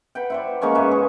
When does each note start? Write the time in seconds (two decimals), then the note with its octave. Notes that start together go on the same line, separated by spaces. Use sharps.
0.15 B4 F#5 G5
0.30 E4 C5 D5
0.61 G#3 A#3 C#4 C#6
0.75 G#2 B4 E5
0.91 G#4